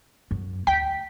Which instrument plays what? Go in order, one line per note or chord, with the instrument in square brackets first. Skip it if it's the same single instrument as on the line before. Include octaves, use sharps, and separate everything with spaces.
[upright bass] F#2
[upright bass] D2 [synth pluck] G5 B6